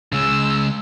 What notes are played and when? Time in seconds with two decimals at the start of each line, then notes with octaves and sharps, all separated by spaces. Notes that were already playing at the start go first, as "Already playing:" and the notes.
0.12 C#3 G#3 E6